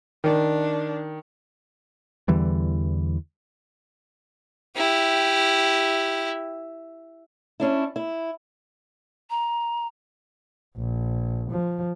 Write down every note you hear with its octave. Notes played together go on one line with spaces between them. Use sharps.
D#3 D4
E2 D3 E3 G3
E4 G4
C#4 D4 E4
E4
A#5
A#1
F3